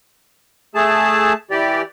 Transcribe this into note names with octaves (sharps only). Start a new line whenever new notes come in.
A3 G#4 A5
E3 G4 D5